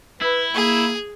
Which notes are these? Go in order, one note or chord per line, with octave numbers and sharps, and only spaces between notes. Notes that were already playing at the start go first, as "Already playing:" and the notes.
E4 B4
A#3 G#4